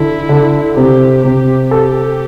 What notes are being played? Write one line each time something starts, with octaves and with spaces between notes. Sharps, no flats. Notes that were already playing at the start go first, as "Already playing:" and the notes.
Already playing: D3 E4
D3
C3 G4
C3 G4
G4 A4